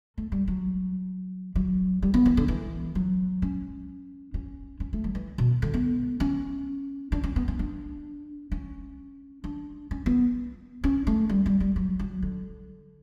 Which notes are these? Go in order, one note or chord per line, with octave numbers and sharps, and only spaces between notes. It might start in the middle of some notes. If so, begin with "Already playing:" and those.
A3
G3
F#3
F#3
G3
B3
E3
D3
E3
F#3
C#4
C#4
C#4
A3
F#3
E3
B2
D3
B3
C#4
D4
C#4
B3
C#4
D4
C#4
D4
C#4
B3
C#4
A3
G3
G3
G3
F#3
F#3
D3